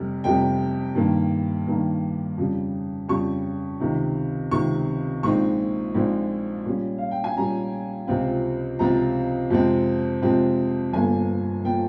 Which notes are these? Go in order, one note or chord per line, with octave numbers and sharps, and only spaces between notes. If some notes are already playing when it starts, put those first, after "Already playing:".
Already playing: F1 C3 G3
F1 F2 C3 G3 G5
G2 D#3 A#3
G2 D#3 A#3
F2 C#3 G3
F2 C#3 G3 C#6
C#2 C3 D#3
C#2 C3 D#3 C#6
A#1 A#2 G#3 C4 D#4 C#6
A#1 A#2 G#3 C4 D#4
A#2 G3 C#4
F5
G5
G#5
A#2 G3 C#4 A#5
C#2 C3 F3 C4 F4
C#2 C3 F3 C4 F4 A#5
F2 C3 F3 G#3 C4
F2 C3 F3 G#3 C4
G1 G2 F3 A#3 G#5
F3 A#3 G5